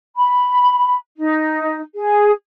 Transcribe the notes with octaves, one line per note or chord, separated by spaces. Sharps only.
B5
D#4
G#4